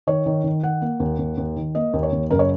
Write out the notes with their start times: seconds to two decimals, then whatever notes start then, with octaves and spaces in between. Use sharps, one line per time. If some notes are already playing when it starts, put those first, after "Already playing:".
0.07 D#3 C#5
0.26 D#3
0.44 D#3
0.63 D#3 F#5
0.81 A#3
1.00 D#2
1.18 D#2
1.37 D#2
1.57 D#3
1.75 A#3 D#5
1.93 D#2
2.03 C#5
2.12 D#2
2.30 F#1 A#4
2.39 C#5